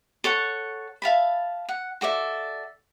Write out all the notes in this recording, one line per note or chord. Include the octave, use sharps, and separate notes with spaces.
A4 C#5 F#5 C#6
E5 F5 A5 B5
F#5
F#4 A4 D5 E5